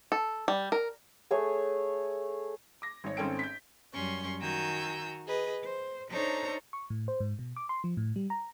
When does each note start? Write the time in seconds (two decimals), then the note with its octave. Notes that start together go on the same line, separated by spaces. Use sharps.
0.12 A4
0.48 G3
0.72 A#4
1.31 A3 G#4 C#5 G#5
2.82 D6 A#6
3.04 G#1 C#5
3.17 G#1 C4 C#4 A4 G5 D7
3.39 G6 B6
3.93 F#2 G3 C#4 C6 C#6
4.40 D#3 F#4 G#5 A#5 E6 G6
5.26 G#4 B4 D#5
5.63 C5
6.10 D4 D#4 A4 C5 C#5 A#5
6.73 C#6
6.90 A2
7.08 C5
7.20 G#2
7.39 B2
7.56 D6
7.69 C6
7.84 F3
7.97 A2
8.16 G3
8.30 A#5